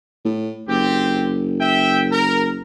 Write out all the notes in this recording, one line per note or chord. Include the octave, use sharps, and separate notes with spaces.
A2
F#1 C4 G4
E5 G5
A#4